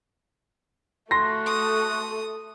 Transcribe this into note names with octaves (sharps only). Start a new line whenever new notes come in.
A3 F#4 C6 A#6
D#6